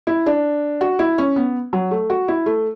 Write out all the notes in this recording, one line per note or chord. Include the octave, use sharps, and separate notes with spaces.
E4
D4
F#4
E4
C#4
B3
F#3
A3
F#4
E4
A3